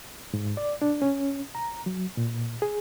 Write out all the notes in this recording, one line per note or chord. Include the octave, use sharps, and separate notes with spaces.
G#2
D5
D4
C#4
A#5
F#3
A#2
G#4